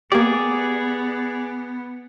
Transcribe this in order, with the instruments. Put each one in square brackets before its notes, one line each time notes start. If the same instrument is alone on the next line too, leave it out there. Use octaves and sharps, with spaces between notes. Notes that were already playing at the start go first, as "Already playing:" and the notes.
[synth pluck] A#3 G4 [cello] B3 [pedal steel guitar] G#4 D5